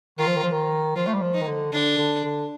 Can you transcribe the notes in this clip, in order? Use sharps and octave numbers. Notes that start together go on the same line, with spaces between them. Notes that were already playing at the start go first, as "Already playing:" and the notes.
D#3 F4
F3
D#3
F3
D#3
F3 F4
A3
G3
F3
D#4
D#3
D3
D3 D4
D3
D3